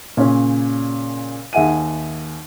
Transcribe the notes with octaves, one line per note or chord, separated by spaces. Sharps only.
A#2 C#3 C#4
D#2 G#4 E5 F#5 G#5 D#7